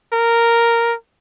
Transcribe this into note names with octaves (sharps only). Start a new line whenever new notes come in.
A#4